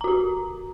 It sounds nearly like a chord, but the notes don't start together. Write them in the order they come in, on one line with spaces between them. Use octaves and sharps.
A#5 F#4 G4